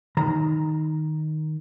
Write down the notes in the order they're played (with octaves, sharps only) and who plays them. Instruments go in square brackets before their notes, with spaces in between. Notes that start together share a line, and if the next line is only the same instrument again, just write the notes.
[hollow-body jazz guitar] D#3 A#5